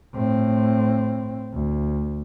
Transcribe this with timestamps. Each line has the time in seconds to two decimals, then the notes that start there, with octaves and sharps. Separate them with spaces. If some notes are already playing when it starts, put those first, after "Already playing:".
0.14 A2 C4
1.54 D2